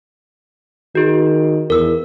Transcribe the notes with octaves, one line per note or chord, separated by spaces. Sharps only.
D#3 F#4 G#4
E2 A#4 E6